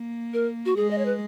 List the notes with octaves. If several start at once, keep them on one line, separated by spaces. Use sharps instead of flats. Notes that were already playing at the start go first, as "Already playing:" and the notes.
Already playing: A#3
A#4
F#4
G#3 G#4
D#5
C#5
B4